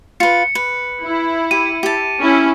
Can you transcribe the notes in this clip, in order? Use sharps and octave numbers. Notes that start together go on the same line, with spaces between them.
F4 B4 C#7
B4
E4
G4 D#7
G4 A5
C#4 E4